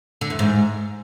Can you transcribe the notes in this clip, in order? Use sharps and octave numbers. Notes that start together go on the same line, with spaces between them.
D3
E2
G#2